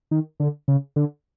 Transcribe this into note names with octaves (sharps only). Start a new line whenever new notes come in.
D#3
D3
C#3
D3